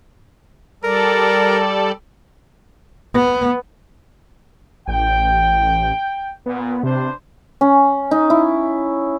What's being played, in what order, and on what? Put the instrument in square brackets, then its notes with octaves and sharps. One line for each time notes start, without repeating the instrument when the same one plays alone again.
[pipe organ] G3 A4 D5 [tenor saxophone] A#4
[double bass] B3
[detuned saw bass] A1 [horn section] G5
[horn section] A#2 [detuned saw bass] B3
[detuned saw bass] C3 [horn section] D4 B4 C5
[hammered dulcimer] C#4
D#4
E4